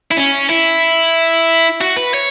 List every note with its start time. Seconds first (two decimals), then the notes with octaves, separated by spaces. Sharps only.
0.11 E4
0.17 C#4
0.50 E4
1.81 F#4
1.97 B4
2.14 C#5